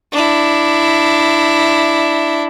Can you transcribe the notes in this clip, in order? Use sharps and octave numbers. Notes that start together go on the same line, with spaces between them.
D4 E4